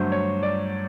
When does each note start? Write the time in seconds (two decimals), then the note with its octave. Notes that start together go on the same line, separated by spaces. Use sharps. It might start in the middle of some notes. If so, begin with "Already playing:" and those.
Already playing: G2 D3 F#3 A3 C5
0.12 C#5
0.43 D5